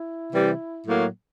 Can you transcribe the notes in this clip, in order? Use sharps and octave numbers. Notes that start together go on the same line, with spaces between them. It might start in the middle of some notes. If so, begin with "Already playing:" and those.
Already playing: E4
C3 E3 G3
A2 F#3 A#3